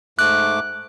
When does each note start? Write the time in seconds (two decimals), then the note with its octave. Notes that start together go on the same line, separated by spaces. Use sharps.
0.19 G#2 A3 D6 F#6